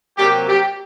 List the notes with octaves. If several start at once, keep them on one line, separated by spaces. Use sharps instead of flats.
C3 F#3 A#3 G4
G4